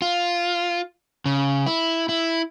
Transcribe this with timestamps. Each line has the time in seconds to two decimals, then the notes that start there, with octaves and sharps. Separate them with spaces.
0.02 F4
1.26 C#3
1.66 E4
2.09 E4